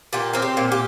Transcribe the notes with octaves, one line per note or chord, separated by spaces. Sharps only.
A#2 G4
C4 A#4
G4
A#2
G4